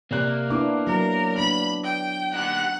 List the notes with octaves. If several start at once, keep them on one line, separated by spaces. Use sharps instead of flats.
C3 A#3 D5 F#6
B3 D4 E4 D6
F#3 A#4
B3 D4 B5
G5
D#4 G4 F#5